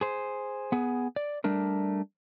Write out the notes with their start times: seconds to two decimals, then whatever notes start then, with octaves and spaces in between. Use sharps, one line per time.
0.01 G#4 C5
0.72 B3 G#4
1.16 D5
1.44 G3 A3 D4 A#4